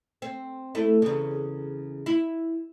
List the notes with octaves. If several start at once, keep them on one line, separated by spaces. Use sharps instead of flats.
C4
A3 E4
E2 C#3
E4